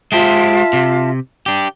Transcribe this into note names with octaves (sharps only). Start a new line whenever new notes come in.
G#3 F4 G4 C5 E5 A5
C3
D4 G4